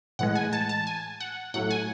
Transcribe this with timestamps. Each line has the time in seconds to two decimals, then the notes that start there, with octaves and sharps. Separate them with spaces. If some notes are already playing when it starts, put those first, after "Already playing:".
0.19 A2 E3 G#3 F#5
0.35 G#5
0.53 A5
0.69 A5
0.87 G#5
1.20 F#5
1.54 A2 F#3 A3 F#5
1.71 G#5